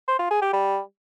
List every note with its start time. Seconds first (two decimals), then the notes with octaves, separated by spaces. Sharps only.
0.08 C5
0.19 F4
0.30 G#4
0.42 G4
0.53 G3